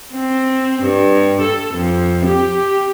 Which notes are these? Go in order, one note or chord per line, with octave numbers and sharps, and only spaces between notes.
C4
G2
A4
F2
G4